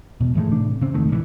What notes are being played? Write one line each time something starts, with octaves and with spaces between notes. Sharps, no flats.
E1 B2
G#2 E3 G#3 A3
A2 C3 D4
C#3 C4
E1 C#2 D#3 A3
A#1 D3 E3